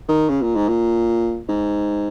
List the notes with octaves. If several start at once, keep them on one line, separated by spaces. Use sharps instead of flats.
D#3
C#3
A#2
G#2
A#2
G#2